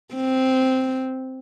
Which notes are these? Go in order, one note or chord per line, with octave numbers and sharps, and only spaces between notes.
C4